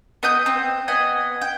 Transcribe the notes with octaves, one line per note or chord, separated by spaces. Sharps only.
B3 D#5 D#6 G6
C4
B3 D#5 F#5 G#5
G5